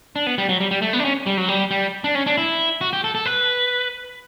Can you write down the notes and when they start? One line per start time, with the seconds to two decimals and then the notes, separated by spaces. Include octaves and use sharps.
0.16 D4
0.27 B3
0.38 G3
0.49 F#3
0.60 G3
0.71 G3
0.82 A3
0.93 B3
0.99 D4
1.05 C#4
1.26 G3
1.37 F#3
1.48 G3
1.71 G3
2.04 D4
2.15 C#4
2.27 D4
2.37 E4
2.81 F#4
2.93 G4
3.04 A4
3.15 A4
3.26 B4